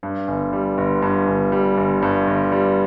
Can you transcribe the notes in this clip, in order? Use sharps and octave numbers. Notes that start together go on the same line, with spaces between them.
G2
G1
G3
G1
G2
G1
G3
G1
G2
G1
G3